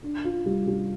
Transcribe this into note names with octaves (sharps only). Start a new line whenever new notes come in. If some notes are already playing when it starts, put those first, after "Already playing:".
D4
F4
G3
G3